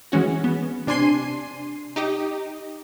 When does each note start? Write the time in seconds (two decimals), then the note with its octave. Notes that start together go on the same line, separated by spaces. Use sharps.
0.12 E3 G#3 C#4 F#4
0.44 B3
0.87 C3 D4 G#5 C6 C7 D#7
1.96 D#4 G4 D#5